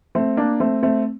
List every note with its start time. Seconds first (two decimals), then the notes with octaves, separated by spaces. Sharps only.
0.15 A3 C4
0.37 A#3 D4
0.60 A3 C4
0.83 A3 C4